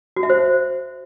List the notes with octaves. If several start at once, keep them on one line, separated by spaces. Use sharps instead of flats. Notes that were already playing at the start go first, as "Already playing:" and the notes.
F#4
E5
C5